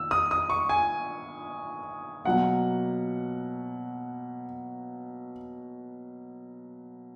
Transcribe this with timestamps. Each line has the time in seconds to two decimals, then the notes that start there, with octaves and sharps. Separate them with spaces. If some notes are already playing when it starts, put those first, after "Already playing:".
Already playing: D#3 A#3 E6
0.11 D#6
0.31 D#6
0.50 C#6
0.69 G#5
2.25 B2 F#3 A#3 F#5